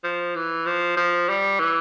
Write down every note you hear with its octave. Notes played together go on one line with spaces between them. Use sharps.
F3
E3
F3
F3
G3
E3